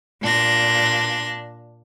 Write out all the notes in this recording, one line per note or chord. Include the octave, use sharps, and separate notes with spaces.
A#2 D4 A#6